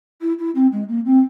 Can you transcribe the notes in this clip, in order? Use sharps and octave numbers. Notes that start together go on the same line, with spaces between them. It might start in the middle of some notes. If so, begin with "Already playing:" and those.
E4
E4
C4
G#3
A#3
C4